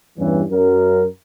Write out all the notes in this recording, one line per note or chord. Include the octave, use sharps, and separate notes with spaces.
E2 G2 E3 G3 C#4
F#2 A#4